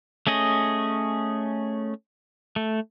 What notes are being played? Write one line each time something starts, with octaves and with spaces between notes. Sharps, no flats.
A3 C#4 G#4 D#5
A3